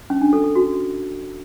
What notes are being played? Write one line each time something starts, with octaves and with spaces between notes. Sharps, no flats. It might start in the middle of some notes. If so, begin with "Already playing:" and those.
C#4
D4
A4
A4
F#4